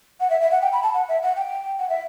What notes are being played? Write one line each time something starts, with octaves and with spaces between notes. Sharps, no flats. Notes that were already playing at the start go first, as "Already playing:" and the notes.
F#5
E5
E5
F#5
G5
B5
A5
F#5
E5
F#5
G5
F#5
E5